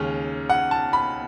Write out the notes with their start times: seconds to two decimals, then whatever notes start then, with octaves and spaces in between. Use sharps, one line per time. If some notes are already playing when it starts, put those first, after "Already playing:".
Already playing: D#2 C#3 G#3 C#4
0.50 F#5
0.71 A5
0.93 B5